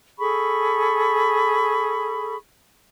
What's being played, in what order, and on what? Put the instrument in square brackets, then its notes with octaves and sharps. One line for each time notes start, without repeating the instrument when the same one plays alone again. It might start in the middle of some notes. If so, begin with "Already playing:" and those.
[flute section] G#4 A4 B5 C#6